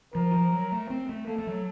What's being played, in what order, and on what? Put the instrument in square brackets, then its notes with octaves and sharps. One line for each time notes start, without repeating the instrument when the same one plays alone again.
[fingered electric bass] F3 [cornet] A#4
[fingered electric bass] F3
F#3
A3
C4
A3
[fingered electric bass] A#3 [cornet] A4
[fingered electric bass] A3
F#3